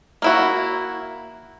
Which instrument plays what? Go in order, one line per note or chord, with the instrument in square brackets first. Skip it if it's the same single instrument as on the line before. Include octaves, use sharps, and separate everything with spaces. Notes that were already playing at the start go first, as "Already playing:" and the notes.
[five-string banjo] A#3 E4 F#4